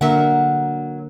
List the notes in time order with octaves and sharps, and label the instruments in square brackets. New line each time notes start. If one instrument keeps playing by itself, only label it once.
[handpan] D3 A#3 A#4 [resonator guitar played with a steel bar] F#3 E5 F#5